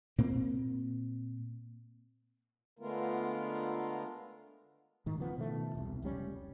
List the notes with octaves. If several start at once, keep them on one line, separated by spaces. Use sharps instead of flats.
A#2 A#3 C4
D3 G#3 A3 B3 F4 A#4
G#2 D#3
C#3 E3 F3 B3
B2 D#3 F3 A3
E1 C2
F1 C#2 G3 C#4